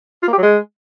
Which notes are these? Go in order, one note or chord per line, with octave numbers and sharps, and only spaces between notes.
F4
A#3
G4
F#3
G#3